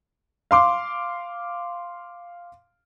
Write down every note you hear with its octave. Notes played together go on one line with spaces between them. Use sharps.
F5 C6 D6